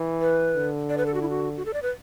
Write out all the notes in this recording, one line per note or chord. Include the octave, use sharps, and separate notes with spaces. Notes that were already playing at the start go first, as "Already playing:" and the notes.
Already playing: E3
B4
D3
D5
B4
A4
F#4
E4
F#4
F#4
A4
D5
B4